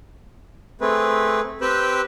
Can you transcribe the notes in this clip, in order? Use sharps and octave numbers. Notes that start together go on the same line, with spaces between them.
A3 C4 G#4 B4
C4 G4 B4 G5 E6 F#6